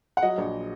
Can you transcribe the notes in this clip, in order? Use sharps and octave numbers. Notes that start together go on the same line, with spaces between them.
F#5
F#3 D#5
A#1